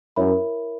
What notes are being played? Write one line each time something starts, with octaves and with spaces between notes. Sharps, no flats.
F#2 E4 A#4 C#5 E5 B5